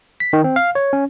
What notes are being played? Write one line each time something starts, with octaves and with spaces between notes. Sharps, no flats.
B6
D#3
C4
F5
C#5
C#4